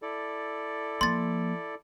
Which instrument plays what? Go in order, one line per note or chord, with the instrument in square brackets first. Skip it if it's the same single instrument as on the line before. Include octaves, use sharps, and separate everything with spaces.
[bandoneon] E4 A4 D5
[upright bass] F3 A#3 [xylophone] C6 A6